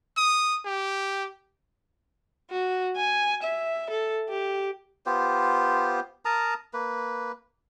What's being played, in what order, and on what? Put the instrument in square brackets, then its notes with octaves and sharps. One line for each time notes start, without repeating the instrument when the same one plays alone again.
[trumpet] D#6
G4
[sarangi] F#4
G#5
E5
A4
G4
[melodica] B3 F4 G4 C5
A#4 A5 A#5 D#6
A#3 B4